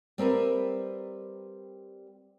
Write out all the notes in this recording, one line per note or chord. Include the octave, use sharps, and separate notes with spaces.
G3 C4 A#4 B4 E5